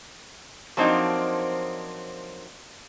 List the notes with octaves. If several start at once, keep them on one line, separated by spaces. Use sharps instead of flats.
F3 F#3 A#3 C4 D4 D#4